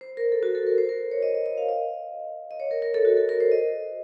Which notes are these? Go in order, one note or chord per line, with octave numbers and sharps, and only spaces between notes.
C5
A#4
A4
F#4
A4
A#4
C5
A#4
C#5
D#5
D#5
D#5
F5
D#5
D#5
C#5
A#4
A#4
A4
F#4
A4
A#4
C5
D#5